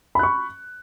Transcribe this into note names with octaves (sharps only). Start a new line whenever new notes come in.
B5 C#6 F#6